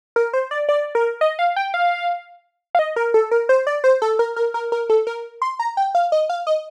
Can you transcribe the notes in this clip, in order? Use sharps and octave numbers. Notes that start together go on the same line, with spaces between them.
A#4
C5
D5
D5
A#4
D#5
F5
G5
F5
F5
D#5
A#4
A4
A#4
C5
D5
C5
A4
A#4
A#4
A#4
A#4
A4
A#4
C6
A#5
G5
F5
D#5
F5
D#5